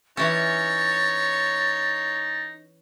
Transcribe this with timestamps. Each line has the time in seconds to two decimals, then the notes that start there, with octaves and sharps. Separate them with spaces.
0.17 E3 C#4 D#4 C#5 A6